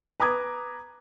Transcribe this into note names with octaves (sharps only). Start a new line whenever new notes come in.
B4 A#5 D6 D#6 G#6